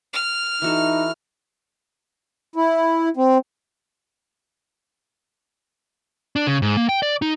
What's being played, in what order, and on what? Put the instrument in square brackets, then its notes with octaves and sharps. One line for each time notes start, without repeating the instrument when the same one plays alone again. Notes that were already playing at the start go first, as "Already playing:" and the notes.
[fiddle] F6
[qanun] E3 F#4 A4 [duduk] D#4
[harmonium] E4
C4
[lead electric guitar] D4
C#3
G#2
A#3
G5
D5
D#4